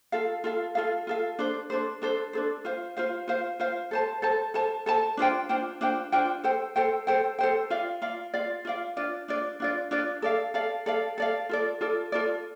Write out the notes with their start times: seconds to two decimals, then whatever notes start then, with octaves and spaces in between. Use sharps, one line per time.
0.12 F4 A4 F5
0.44 F4 A4 F5
0.75 F4 A4 F5
1.07 F4 A4 F5
1.39 D4 A4 C5
1.70 D4 A4 C5
2.02 D4 A4 C5
2.33 D4 A4 C5
2.65 F4 C5 F5
2.97 F4 C5 F5
3.28 F4 C5 F5
3.60 F4 C5 F5
3.91 A4 C5 A5
4.22 A4 C5 A5
4.54 A4 C5 A5
4.86 A4 C5 A5
5.17 D4 F4 C5 G5
5.49 D4 F4 C5 G5
5.81 D4 F4 C5 G5
6.12 D4 F4 C5 G5
6.44 A4 C5 G5
6.76 A4 C5 G5
7.07 A4 C5 G5
7.39 A4 C5 G5
7.70 F4 D5 F5
8.02 F4 D5 F5
8.34 F4 D5 F5
8.65 F4 D5 F5
8.97 D4 F4 D5
9.28 D4 F4 D5
9.60 D4 F4 D5
9.91 D4 F4 D5
10.22 A4 D5 F5
10.54 A4 D5 F5
10.86 A4 D5 F5
11.18 A4 D5 F5
11.49 F4 A4 D5
11.81 F4 A4 D5
12.12 F4 A4 D5